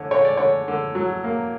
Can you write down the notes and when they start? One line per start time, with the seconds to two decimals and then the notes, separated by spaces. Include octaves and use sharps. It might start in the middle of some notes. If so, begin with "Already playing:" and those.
Already playing: D3 C#5
0.11 D3 C#5
0.25 D5
0.37 D3 C#5
0.68 D3
0.95 F#3
1.24 A#3